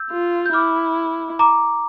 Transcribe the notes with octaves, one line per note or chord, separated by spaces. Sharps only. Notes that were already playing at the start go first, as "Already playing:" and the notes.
Already playing: E6 G6
F4
G6
E4 D6 F6
A#5 D6